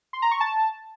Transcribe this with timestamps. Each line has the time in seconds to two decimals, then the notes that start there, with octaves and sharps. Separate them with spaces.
0.13 C6
0.22 A#5
0.31 C#6
0.40 A5